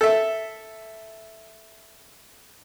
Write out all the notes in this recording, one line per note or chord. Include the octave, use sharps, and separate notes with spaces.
A4 E5